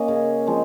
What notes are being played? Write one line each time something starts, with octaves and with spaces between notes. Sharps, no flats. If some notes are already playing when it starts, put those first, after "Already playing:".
Already playing: A#3 C#4 D#5 F5
C#3
F3 G#3 C4